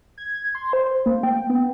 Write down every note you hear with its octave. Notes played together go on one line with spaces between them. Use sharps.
G#6
C6
C5
A#3
G5
B3